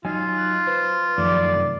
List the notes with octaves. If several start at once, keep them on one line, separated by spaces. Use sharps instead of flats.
F#3 D#4 F4 G#5
F#6
B4 C5
F#2 D#3 F3 A3 D5
C3